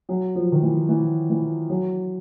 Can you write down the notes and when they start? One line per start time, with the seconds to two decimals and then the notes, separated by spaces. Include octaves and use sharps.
0.09 F#3
0.35 F3
0.52 D#3
0.62 E3
0.89 E3
1.30 E3
1.70 F#3